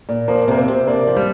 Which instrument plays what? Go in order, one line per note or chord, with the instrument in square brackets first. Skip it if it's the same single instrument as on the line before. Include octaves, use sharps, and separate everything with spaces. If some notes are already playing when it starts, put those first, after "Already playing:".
[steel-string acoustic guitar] A#2
[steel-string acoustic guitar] F3 [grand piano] A#3
[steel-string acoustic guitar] C3 [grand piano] A#3
[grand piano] C4
[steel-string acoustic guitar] C3
[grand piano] A#3 [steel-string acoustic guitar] D4
[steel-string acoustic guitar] F3
[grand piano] G3